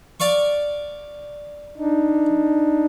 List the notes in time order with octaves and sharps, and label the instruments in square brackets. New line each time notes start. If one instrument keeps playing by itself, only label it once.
[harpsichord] D5 F5 C#6
[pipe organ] D4 D#4